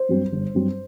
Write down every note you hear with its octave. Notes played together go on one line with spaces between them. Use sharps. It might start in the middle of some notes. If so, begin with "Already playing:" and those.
Already playing: C5
G2 F#3 C4
G1
G2 F#3 C4